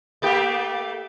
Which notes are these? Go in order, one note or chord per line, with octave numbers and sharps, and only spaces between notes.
A3 A#3 G4